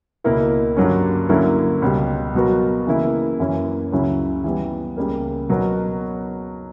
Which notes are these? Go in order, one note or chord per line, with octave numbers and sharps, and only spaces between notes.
C#2 B2 A#3 E4 A#4
G2 D3 F#3 A#3 C#4
D3 F#3 A#3 C#4 E4
C#2 B2 G3
B2 F#3 B3 F#4 A#4
C#3 E3 A#3 E4
F#2 E3 A#3 C#4
C#2 C#3 F#3 C#4 E4
E3 G3 B3
C#2 C#3 G3 A#3
B2 F#3 B3 F#4 A#4